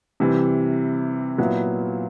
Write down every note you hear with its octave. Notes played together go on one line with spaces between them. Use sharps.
C3 E3 G3
A#2 F#3 B3 E4